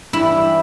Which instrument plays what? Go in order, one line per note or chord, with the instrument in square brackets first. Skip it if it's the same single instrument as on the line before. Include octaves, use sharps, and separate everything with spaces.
[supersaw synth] G2 E3 G3 D4 G4 [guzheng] E4